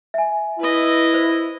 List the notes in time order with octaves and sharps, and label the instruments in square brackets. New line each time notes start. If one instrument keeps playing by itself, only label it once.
[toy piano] E5 G#5
[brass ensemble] E4 [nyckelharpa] B4 D#5
[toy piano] C5